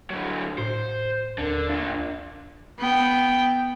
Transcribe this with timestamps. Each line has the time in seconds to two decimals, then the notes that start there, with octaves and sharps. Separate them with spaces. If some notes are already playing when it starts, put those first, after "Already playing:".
0.10 D3 F#3
0.58 A2 C5
1.38 D#2 D3 A#4
1.69 F3 D4
2.79 B3 G5